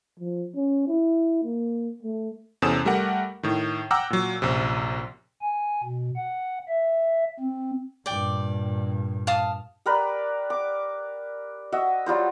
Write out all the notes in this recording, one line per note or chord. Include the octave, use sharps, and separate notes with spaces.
F3
C#4
E4
A#3
A3
E2 C3 C#4 A4 D#6 E7
G3 A3 G4 A#4 F#5
A2 D#3
F#5 G5 A#5 D6 E6 F6
A#2 F#3
A#1 F#2 C3
G#5
B2
F#5
E5
C4
G2 A#2 D5 G5
F5 A5 D#6
G4 A#4 B4 D5
D6
F#4 D#5 E5
F#3 G3 F4 C5